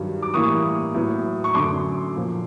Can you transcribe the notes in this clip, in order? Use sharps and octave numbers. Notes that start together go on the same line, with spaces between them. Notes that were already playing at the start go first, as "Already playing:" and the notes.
Already playing: G2 D#3 F#3
D6
A2 E3 G3 A#3 C#6 D#6
A2 F#3 B3
C#6
F#2 D3 F#3 A3 C6 D6
A#2 F3 A#3